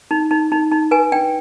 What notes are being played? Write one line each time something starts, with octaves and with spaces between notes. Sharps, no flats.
D#4
D#4
D#4
D#4
B4 G#5
D4 G5